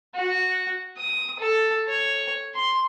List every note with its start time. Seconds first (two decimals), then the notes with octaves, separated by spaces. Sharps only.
0.15 F#4
0.97 D#6
1.39 A4
1.88 C#5
2.54 C6